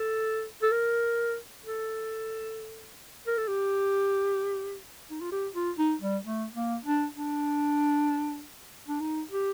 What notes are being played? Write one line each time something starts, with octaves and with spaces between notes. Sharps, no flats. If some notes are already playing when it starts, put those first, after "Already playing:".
Already playing: A4
A4
A#4
A4
A#4
A4
G4
D#4
F4
G4
F4
D#4
G3
A3
A#3
D4
D4
D4
D#4
G4